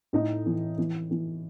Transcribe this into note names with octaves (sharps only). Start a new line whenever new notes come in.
A2 D#4
E3
E3
E3